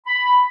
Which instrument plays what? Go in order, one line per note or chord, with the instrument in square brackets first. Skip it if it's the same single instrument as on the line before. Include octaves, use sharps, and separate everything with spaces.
[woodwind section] B5